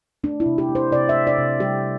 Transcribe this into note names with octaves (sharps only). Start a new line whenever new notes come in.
A3 D4
E4
C3
G4
A3
C5
C3 D5
E5
A3
D5
C3
G3 G4